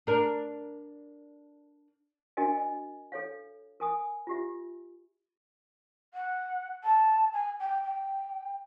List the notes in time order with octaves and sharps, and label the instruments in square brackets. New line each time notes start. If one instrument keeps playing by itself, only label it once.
[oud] D4 A#4
[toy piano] D4 F#4 A#4 D#5 G5 G#5
D#5
A4 C#5 F5
A#4 G#5 D#6
F4 G4 E5
[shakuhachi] F#5
A5
G#5
G5
G5